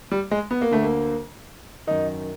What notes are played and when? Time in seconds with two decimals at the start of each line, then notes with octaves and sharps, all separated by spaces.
0.12 G3
0.31 G#3
0.51 B3
0.61 A#3
0.71 D2 D3 A3
0.82 A#3
1.87 F#2 D#3 D#4